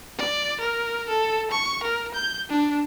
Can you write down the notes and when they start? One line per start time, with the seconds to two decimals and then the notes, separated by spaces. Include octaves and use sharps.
0.18 D5
0.61 A#4
1.09 A4
1.51 C#6
1.83 A#4
2.15 G6
2.49 D4